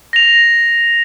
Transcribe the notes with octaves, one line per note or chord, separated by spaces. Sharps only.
A#6 F7